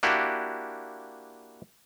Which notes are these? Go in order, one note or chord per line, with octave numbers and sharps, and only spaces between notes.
A#3 D4 E4 F#4 G4